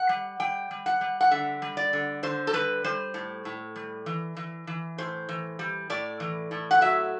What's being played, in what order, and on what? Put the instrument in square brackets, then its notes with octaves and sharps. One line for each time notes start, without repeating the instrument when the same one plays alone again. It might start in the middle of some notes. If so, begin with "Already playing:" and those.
Already playing: [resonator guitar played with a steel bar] F#5
G3
G3 G5
G3
F#5
G3
F#5
D3 E5
G3
D5
D3
D3 C5
A4
G3 B4
G3 C5
A2
A2
G3
E3
E3
E3
A2 C5
E3
G3
A2 D5
E3
A2
F#5
F#3 E5